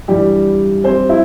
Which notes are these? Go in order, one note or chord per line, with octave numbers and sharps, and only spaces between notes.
G2 E3 G3 G4
C4 C5
E4